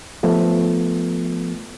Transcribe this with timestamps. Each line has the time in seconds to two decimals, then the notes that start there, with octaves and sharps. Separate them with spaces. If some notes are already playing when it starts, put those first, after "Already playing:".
0.23 F3 A3 B3